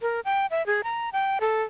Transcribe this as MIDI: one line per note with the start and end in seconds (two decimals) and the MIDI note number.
0.01 0.20 70
0.25 0.46 79
0.51 0.65 76
0.66 0.81 68
0.84 1.09 82
1.13 1.39 79
1.41 1.63 69